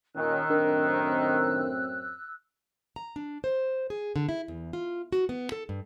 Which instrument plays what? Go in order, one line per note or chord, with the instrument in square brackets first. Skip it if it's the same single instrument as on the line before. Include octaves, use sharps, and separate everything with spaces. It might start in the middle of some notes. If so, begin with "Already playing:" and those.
[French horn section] D#2 A#2 C#4 [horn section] D#3 [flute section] E6 F#6
[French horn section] F#2 A2 C4 [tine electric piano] D4 A#4
[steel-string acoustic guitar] A#5
D4
C5
G#4
D3
E4
E2
F4
F#4
B3
A4
G2